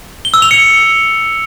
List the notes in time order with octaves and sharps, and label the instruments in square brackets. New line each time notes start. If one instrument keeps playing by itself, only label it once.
[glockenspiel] G7
E6
F7
C#7